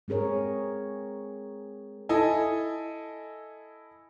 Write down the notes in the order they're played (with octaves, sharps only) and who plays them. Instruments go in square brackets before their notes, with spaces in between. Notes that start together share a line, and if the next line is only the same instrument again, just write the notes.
[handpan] G#3 C4 G#4 A#4 C#5
[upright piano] E4 A4 D#5 G#5